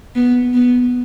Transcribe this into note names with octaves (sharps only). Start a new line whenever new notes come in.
B3
B3